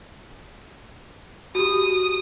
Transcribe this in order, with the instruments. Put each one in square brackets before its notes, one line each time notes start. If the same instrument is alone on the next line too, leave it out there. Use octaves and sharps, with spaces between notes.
[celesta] F#4 G4 [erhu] D#6